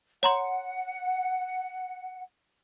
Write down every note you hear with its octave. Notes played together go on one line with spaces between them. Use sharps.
C#5 F#5 A#5 C6